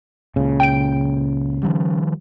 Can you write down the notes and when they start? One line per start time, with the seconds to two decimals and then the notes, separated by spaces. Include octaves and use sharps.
0.36 C#2 A#2 C#3
0.60 G5 D7
1.63 D#3 F3 G3